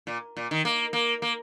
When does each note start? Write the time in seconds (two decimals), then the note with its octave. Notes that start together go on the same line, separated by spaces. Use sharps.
0.07 A#2
0.37 A#2
0.51 D#3
0.65 A#3
0.93 A#3
1.22 A#3